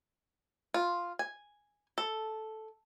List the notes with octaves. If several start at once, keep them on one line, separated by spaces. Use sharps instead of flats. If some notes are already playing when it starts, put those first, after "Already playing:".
F4
G#5
A4